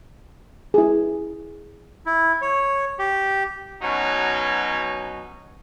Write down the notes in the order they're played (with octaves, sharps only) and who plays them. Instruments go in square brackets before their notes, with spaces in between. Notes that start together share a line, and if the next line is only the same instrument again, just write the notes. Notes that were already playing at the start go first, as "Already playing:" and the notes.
[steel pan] E4 G#4
[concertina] E4
C#5
G4
[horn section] B2 F#3 C#4 D#4